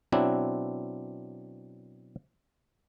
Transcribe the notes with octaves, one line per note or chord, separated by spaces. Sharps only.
B2 F#3 C4 D4 E4